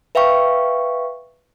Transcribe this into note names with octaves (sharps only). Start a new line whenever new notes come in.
B4 E5 F5 G5 C#6